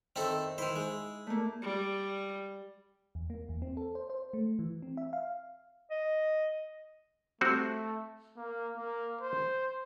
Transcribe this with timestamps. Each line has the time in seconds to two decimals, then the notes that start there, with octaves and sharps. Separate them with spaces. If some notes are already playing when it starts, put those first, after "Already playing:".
0.16 D#3 C4 E4 A4
0.58 D#3 E4 C5
0.76 G#3
1.27 A3 A#3
1.62 G3
3.15 E2
3.30 A#3
3.49 E2
3.62 C4
3.77 A4
3.95 C5
4.10 C5
4.33 A3
4.59 E3
4.82 C4
4.97 E5
5.13 F5
5.91 D#5
7.41 G3 A3 C4 F#4
8.37 A#3
8.77 A#3
9.21 C5